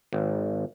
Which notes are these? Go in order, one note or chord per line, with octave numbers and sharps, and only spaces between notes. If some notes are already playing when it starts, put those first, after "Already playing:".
G#1